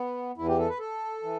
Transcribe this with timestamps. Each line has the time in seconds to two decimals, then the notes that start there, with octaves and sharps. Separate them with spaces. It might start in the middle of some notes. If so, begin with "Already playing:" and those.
Already playing: B3
0.37 E2 E3 E4
0.48 G4
0.59 A4
0.69 B4
0.80 A4
1.23 E3